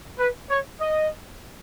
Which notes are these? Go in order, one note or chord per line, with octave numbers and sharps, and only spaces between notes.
B4
C#5
D#5